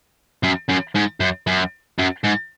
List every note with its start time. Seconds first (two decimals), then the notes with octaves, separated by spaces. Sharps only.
0.44 F#2
0.69 F#2
0.95 G#2
1.20 F#2
1.47 F#2
1.99 F#2
2.24 G#2